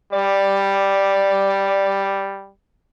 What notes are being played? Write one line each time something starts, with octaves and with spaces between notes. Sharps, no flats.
G3 D5